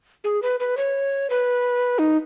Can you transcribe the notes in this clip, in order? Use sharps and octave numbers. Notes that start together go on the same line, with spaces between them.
G#4
B4
B4
C#5
B4
D#4